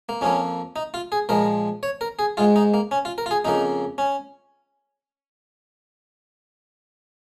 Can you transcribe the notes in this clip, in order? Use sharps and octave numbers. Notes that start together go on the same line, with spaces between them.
A#3
F2 F3 A#3 C#4
D#4
F4
G#4
A#2 F3 G#3 A#4
C#5
A#4
G#4
G#2 G#3 F4
D#4
A#3
C#4
F4
A#4
F4
G#4
F2 C#3 A#3 D#4
C#4